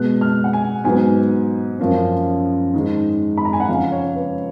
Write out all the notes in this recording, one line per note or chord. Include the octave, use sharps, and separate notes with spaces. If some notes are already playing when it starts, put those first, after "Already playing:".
Already playing: B2 G#3 B3 F#6
F6
F#5
G#5
G#2 F#3 B3 G#5
F#2 F3 A#3 C#4
G#2 D#3 G#3
B5
A#5
G#5
F#5
F2 C#3 F3 F5
C#5
B4